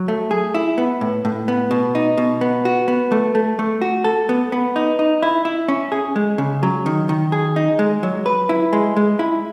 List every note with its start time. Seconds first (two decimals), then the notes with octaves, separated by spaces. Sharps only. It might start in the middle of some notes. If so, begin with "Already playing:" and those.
Already playing: F#3
0.08 A3
0.31 G#4
0.54 E4
0.78 B3
1.01 A2
1.25 A2
1.48 B3
1.71 B2
1.95 D#4
2.17 B2
2.41 B3
2.65 F#4
2.88 B3
3.12 A3
3.35 A3
3.59 A3
3.82 F#4
4.04 A4
4.29 B3
4.52 B3
4.76 D#4
4.99 D#4
5.23 E4
5.45 E4
5.68 C#4
5.92 G#4
6.16 G#3
6.38 C#3
6.63 F#3
6.86 D#3
7.09 D#3
7.32 G#4
7.56 D#4
7.79 G#3
8.03 F#3
8.26 B4
8.49 E4
8.73 G#3
8.96 G#3
9.19 E4